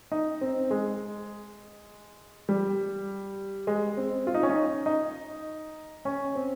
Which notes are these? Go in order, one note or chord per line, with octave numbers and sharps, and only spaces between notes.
D#4
C4
G#3
G3
G#3
C4
F4
D#4
C#4
D#4
D#4
C#4
C4